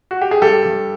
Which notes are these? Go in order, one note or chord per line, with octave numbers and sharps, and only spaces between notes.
F#4
G4
G#4
G2 G4 A4
G2